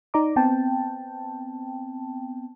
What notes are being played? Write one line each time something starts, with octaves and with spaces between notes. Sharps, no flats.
D#4 D5 A#5 D6
B3 C4 G5 A5